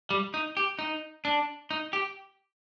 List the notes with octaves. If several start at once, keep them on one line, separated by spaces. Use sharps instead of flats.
G3
D#4
G4
D#4
D4
D#4
G4